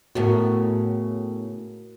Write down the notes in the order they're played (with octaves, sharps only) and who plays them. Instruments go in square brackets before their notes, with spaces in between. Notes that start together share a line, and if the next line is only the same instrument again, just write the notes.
[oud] A2 C#3 B3 [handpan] F#4 A#4